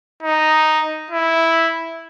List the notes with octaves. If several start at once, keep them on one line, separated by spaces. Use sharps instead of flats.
D#4
E4